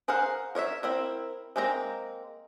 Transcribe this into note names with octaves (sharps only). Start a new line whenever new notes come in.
G#4 A#4 C5 F5 F#5
A#4 C#5 D#5 E5
C4 E4 A#4
G#3 A#3 C4 B4 A#5